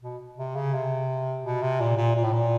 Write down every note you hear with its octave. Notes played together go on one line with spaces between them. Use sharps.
B2
C3
C#3
C3
B2
C3
A#2
A#2
A#2
A2
A#2